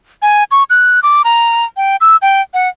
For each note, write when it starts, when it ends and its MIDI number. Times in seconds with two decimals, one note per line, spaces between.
0.22 0.44 80
0.51 0.63 85
0.70 1.00 90
1.03 1.22 86
1.24 1.65 82
1.77 1.96 79
2.01 2.16 88
2.22 2.41 79
2.54 2.68 78